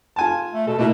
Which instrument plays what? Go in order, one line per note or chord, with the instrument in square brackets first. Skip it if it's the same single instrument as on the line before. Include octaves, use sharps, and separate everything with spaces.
[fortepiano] F4 G#5 A5
[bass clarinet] A3
[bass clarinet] B2 [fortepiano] A4
[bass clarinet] B2 [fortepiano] A3 A#3 E4